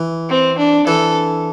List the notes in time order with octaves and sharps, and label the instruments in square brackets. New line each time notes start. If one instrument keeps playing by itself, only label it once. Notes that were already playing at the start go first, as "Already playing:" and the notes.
Already playing: [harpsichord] E3
[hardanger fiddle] C4
D4
[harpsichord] E3 [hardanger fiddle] A4